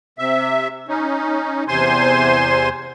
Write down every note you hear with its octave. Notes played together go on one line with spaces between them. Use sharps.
C3 E5
C#4 D#4
E2 C3 C5 G#5 C6